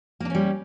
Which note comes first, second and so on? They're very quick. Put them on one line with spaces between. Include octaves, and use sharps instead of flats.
A#3 D4 C#4 G3